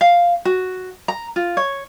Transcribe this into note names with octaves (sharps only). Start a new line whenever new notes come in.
F5
F#4
A#5
F4
C#5